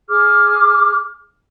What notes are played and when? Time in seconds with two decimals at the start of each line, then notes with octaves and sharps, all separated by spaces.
0.10 G#4 D6 F6